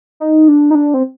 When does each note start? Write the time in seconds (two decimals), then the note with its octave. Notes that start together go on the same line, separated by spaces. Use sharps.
0.20 D#4
0.48 D4
0.71 D#4
0.75 D4
0.94 C4